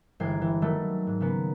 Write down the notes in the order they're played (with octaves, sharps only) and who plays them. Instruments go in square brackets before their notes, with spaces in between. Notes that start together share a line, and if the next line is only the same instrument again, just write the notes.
[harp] G1 E3 G#3 G5 G#6 C7
E3
D#3 F#3 G3 A3 B3
G#2
C#3 A#3 B3 C#4